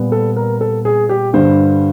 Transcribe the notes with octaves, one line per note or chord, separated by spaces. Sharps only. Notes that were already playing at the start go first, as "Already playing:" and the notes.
Already playing: A#2 G3 B3
A4
A#4
A4
G#4
G4
G2 D3 G3 C5